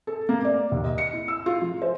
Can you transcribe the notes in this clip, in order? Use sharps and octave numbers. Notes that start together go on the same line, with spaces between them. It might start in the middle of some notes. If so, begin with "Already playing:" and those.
A4
A#3
D5
D#2
D#5
C#7
E4
E6
F4
F3
C5